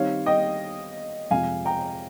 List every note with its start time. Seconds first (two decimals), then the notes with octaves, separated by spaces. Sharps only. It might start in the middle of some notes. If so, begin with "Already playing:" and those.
Already playing: D#3 G3 C4 D#4 C#5 F5
0.26 D#5 G5
1.31 F2 C3 F3 G#3 F5 G#5
1.66 G5 A#5